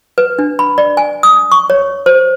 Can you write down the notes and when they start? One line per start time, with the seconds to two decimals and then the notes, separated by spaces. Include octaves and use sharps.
0.18 B4
0.39 D4
0.59 B5
0.78 D5
0.97 G#5
1.23 D#6
1.52 C#6
1.70 C#5
2.06 C5